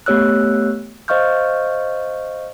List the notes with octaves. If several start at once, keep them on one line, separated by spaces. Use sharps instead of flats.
A3 B3 G4 C#5 E6 F#6
C5 D#5 F5 C#6 F6 G6